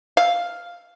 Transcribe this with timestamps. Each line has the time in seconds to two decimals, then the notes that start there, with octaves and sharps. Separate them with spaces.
0.17 F5